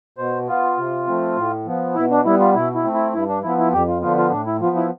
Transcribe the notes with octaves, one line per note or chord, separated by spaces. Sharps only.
B2 C5
B3 F4
C3
F3 A3 C4
A2
F3 B3
B2 E4
D4
G3 B3 E4
F4
B2 E4
E4
A3 C4
E4
G2 E4
D4
F3 B3 E4
E4
F2 G4
F4
D3 F3 B3 F4
F4
A2 D4
E4
F3 B3 F4
E4